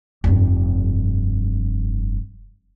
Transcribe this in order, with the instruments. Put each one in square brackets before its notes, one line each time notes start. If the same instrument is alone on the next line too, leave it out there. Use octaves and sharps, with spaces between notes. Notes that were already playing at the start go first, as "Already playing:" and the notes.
[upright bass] F1 G2